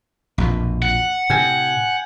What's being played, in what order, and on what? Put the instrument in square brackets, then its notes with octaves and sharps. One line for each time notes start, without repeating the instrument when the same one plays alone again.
[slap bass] A#1 F2 B2
[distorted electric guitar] F#5
[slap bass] A2 C3 [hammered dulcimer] G5 G#5